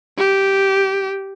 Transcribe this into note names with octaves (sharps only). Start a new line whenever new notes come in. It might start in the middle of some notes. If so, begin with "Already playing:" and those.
G4